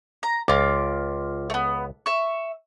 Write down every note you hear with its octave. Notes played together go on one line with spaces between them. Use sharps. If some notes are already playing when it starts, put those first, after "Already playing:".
A#5
C#2 F4 D6
A3 B3
E5 C#6